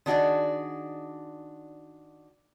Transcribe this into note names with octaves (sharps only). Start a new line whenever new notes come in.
D#3 D4 F#4 G#4 D5